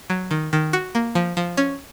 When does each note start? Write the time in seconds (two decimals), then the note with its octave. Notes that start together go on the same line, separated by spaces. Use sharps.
0.10 F#3
0.31 D#3
0.53 D#3
0.73 F#4
0.95 A#3
1.15 F3
1.37 F3
1.57 C#4